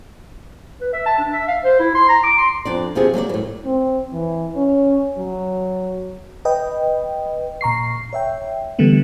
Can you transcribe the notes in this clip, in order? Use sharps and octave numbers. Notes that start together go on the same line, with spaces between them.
B4
E5
A5
D4
E5
F5
C5
E4
C6
A#5
D6
C6
F2 D4 D5
D#2 C3 F3 G#4
F#3 A#3 C5 D5
A2 E3
C4
E3
C#4
F#3
B4 D#5 G5
A#2 A#5 C#6 C7
C#5 E5 G5
D3 E3 G3 A3 B3